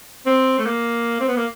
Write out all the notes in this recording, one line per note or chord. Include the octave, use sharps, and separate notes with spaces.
C4
A3
A#3
C4
B3
A#3